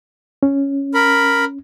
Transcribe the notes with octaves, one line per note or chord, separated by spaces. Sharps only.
C#4
A#4 B5